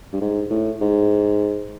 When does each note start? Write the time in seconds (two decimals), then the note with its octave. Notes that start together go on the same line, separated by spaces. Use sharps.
0.13 G2
0.21 G#2
0.50 A2
0.81 G#2